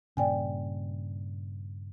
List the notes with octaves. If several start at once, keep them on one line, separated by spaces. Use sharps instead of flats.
G2 A#2 C#3 D5 G5 G#5